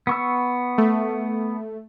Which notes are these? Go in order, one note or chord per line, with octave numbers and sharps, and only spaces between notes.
B3 C#6 E6
A3